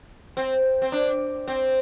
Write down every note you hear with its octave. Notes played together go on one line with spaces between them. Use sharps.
C4
C4
D4
C4